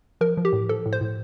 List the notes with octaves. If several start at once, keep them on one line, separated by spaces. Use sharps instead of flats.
F3 A#4
F3
G4
A2
F3 A4
A2
C5
A2